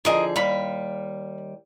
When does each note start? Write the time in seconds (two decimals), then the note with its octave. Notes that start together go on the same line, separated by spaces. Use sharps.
0.05 D3 F3 G#4 A#4 D#5
0.36 D#2 G3 F5 B5